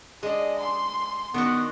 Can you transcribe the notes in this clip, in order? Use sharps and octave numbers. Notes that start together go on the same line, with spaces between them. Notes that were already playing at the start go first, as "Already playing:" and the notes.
G#3 D4 G#4 D#5
C6
D#3 B3 D4 F#4